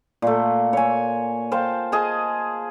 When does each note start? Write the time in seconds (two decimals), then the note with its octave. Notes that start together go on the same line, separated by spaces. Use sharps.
0.22 A#2 A3
0.73 C#5 G#5
1.52 C5 F5 G5 A5
1.92 G#4 D#5 F5 A5